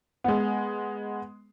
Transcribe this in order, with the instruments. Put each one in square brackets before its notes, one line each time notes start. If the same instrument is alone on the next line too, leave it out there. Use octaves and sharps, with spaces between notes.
[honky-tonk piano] G#3 B3